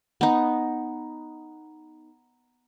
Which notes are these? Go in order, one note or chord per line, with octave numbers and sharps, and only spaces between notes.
B3 D#4